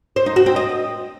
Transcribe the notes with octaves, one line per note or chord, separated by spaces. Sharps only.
C5
D#4
F#4
C4
D#5